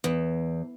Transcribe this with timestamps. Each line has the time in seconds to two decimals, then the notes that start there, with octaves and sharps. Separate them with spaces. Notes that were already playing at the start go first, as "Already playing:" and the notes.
0.04 E2